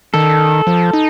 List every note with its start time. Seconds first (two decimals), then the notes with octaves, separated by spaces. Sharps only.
0.14 D#3 A4
0.67 F3
0.93 D#4